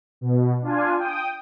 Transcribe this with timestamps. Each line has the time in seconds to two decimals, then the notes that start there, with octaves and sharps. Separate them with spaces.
0.21 B2
0.62 D4 F4 G#5
0.98 G5 D#6